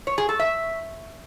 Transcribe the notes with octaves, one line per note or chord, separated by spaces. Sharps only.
C#5
G#4
A4
E5